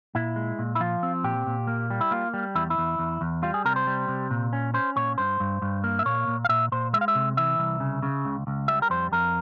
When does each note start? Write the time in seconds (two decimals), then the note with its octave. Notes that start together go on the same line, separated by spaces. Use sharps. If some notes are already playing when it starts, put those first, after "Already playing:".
0.15 A#2 E4
0.36 G#3
0.59 A#2
0.75 E4
0.80 F3 F4
1.03 C4
1.24 A#2 G4
1.47 A#2
1.67 A#3
1.90 G3
2.01 E4
2.11 A#3 F4
2.34 G3
2.55 E2 E4
2.70 E4
2.78 E2
2.99 E2
3.21 E2
3.43 G3 F4
3.54 G#4
3.65 C3 A#4
3.76 C5
3.87 G3
4.08 C3
4.30 A#2
4.53 C#4
4.74 C#4 C5
4.96 A#2 C#5
5.18 G2 C5
5.40 G2
5.62 G2
5.84 A#3
5.99 E5
6.05 A#2 C#5
6.28 A#2
6.45 F5
6.49 A#2 E5
6.72 A#2 C5
6.93 G#3 E5
7.01 F5
7.08 E5
7.15 C3
7.37 E3 E5
7.58 C2
7.80 C#3
8.03 C#3
8.25 C#2
8.47 C#2
8.68 G3 E5
8.82 A#4
8.90 F2 C5
9.12 F2 A#4